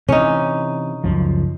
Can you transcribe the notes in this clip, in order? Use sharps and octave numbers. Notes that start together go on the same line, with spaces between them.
C3 E3 C#4 D#4
C#2 F#2 F3